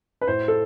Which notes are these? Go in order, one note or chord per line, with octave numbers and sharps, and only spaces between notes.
B4
A2 C5
A4